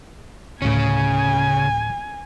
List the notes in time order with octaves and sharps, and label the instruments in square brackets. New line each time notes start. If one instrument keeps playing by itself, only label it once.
[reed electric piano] D2 A2 [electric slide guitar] C#3 C#4 [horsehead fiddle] G#5